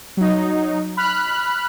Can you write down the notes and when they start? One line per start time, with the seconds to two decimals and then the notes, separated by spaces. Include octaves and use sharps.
0.17 F#3 D#4
0.97 B5 F6 F#6